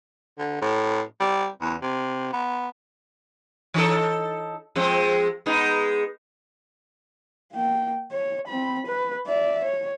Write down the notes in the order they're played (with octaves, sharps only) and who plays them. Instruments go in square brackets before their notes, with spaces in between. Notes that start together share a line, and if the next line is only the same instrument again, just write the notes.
[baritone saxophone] D3
A2
G3
E2
C3
B3
[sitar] E3 D#4 A4
F3 G#3 C4
G#3 B3 D#4
[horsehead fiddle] A#3 G5
C#5
C4 B5
B4
D5 E5
C#5